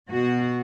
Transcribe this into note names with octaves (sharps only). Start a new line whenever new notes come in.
B2 F#4